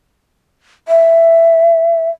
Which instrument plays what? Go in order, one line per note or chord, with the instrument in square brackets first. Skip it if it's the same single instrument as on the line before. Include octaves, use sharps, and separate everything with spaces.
[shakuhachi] E5